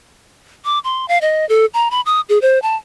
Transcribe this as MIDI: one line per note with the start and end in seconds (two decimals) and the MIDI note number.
0.65 0.79 86
0.84 1.06 84
1.08 1.18 77
1.21 1.47 75
1.49 1.66 69
1.74 1.89 82
1.91 2.01 83
2.06 2.21 87
2.29 2.39 68
2.42 2.59 72
2.62 2.76 81